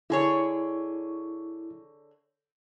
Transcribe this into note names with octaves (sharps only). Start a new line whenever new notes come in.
D3 E4 G#4 C#5